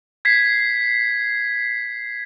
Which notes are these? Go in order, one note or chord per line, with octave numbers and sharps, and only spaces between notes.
G#6 B6 C7